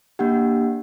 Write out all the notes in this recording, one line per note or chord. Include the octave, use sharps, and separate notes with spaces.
A#3 D4 G4 F#5